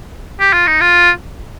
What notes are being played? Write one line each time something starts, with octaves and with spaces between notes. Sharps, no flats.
G4
F4
D#4
F4